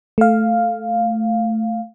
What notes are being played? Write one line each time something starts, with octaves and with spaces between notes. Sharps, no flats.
A3 F5